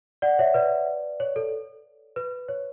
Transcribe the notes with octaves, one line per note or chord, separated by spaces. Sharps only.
D5 F#5
C#5 E5
B4 D5
C#5
A4
B4
C#5